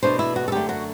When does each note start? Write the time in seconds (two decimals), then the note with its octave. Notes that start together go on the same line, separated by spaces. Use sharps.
0.02 E2 B2 A3 D4 C5
0.19 E4
0.36 F#4
0.48 A4
0.52 F#2 D3 A3 G4
0.69 F#4